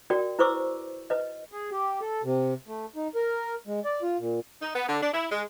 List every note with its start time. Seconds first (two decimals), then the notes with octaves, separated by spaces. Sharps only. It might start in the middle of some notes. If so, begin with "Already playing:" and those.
0.10 F#4 A#4 D5 G5
0.39 E4 B4 C5 C#6 D6 E6
1.10 B4 D#5
1.52 G#4
1.71 G4
2.01 A4
2.24 C3
2.67 A3
2.96 D#4
3.15 A#4
3.67 G#3
3.85 D5
4.02 F4
4.19 A#2
4.62 D#4
4.75 B3
4.89 D3
5.03 D4
5.14 E4
5.32 G#3